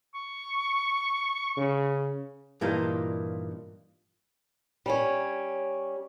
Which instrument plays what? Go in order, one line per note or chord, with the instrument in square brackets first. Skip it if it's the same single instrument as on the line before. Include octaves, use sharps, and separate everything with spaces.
[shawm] C#6
[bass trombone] C#3
[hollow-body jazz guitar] G2 A#2 E3 A#3 D#4 F4
[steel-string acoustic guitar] G3 C#4 C#5